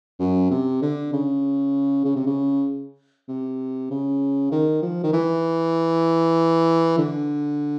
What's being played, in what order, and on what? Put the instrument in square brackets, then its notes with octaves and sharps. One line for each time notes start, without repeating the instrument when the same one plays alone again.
[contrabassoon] F#2
C3
D3
C#3
C#3
C3
C#3
C3
C#3
D#3
F3
D#3
E3
D3